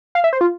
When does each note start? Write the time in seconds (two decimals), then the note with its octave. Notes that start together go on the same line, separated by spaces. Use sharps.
0.15 F5
0.24 E5
0.33 C5
0.41 F4